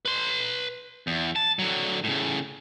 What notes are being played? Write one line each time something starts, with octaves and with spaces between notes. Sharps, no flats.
B4 C6
E2
A5
D3 F#3
A2 C#3